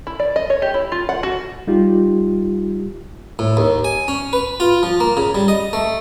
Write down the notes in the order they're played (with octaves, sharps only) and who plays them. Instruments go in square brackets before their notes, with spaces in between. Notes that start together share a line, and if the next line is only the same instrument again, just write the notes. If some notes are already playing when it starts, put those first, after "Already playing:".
[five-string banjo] E4
D5
D#5
C#5
G4
E4
F4
F#5
F#4
[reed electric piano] G3 D#4 F4 G4
[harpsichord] A2
D#2
G#5
C#4
B4
F4
F3
A#3
C#3
G3
D#5
A3